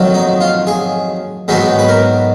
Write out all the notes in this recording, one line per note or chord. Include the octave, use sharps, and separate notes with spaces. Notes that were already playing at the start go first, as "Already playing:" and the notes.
Already playing: F2 D#3 F#3
D#4
F4
G#4
G#2 D#3 F#3 B3 D#4 G#4
B4
A#4